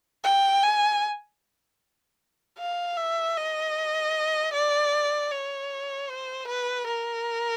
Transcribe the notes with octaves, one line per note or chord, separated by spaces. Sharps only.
G5
G#5
F5
E5
D#5
D5
C#5
C5
B4
A#4